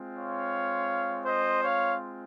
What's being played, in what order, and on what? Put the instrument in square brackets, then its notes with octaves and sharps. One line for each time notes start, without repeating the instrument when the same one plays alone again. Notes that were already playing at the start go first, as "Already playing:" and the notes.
Already playing: [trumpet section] G#3 C4 F4
C#5 F5
C5 D#5
C#5 F5